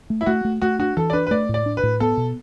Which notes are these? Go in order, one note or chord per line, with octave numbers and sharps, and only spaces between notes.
A3
E4
A3 F#4
A3
A3 F#4
D4 F#4
E3 A4
D5
D4 B4
B4
A3 D5
A2
D5
D4
B4
A2
B3 A4
B2